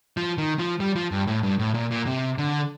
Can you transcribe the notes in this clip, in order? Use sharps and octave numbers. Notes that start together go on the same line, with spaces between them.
F3
D#3
F3
G3
F3
G2
A2
G2
A2
A#2
A#2
C3
D3